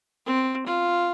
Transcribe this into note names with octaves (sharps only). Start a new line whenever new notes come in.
C4
F4